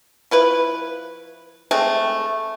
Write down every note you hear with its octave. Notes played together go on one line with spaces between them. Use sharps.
F3 E4 B4
G#3 A3 C4